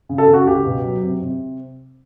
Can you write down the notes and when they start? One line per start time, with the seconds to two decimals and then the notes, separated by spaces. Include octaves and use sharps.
0.09 C#3
0.18 A4
0.28 C#3
0.33 F#4
0.47 C#2 G4
0.65 B2
0.84 F#3
1.03 C3
1.22 C3